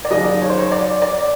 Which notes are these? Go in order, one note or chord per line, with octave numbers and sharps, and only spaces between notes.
D5
D#2 C#3 F#3 D#5
C#5
C5
C#5
D5
D5